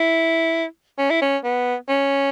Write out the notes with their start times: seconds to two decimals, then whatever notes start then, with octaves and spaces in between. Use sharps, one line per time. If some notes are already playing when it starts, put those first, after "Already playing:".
Already playing: E4
0.98 C#4
1.10 E4
1.22 C#4
1.44 B3
1.89 C#4